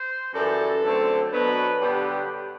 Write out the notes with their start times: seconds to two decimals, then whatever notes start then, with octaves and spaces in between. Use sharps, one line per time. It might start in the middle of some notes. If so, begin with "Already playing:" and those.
Already playing: C5
0.34 F#2 E3 G3 A4
0.82 D3 F#3 A3 C4
1.32 B2 F#3 B3 D4 B4
1.80 G2 D3 G3 B3 D4 G4